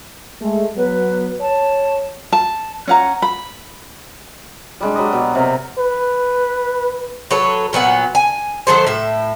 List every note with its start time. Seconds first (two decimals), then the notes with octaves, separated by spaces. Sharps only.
0.41 G#3 A3
0.76 F#3 B3 B4
1.40 C#5 A5
2.32 A5
2.87 C#4 F#5 A#5
3.22 B5
4.81 G3 G#3 D4
4.96 F#3 G3 D#5
5.13 B2
5.35 C3 A#4
5.78 B4
7.31 F#3 A4 B4 C#5
7.73 A#2 F#3 B3 F#5
8.15 G#5
8.67 D#3 F#3 A4 C5
8.87 A2 E5